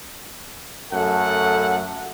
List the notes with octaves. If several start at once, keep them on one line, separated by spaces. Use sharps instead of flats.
F#2 A3 A4 F#5